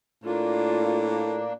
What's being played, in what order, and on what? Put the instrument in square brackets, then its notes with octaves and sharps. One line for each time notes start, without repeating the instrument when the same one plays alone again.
[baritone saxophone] A2 [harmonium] A#3 D4 [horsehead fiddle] F4